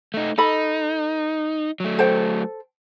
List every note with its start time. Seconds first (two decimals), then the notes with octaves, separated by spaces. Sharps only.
0.14 A3 D#4
0.38 D#4 A4 D#5 B5
1.80 F#3 A3
1.99 A4 C5 G5